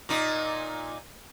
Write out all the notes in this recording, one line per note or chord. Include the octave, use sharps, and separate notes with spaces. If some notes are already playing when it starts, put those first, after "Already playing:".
A#2 D#4